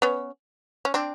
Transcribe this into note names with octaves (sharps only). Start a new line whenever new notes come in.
B3 C#4
C#4
C4 D4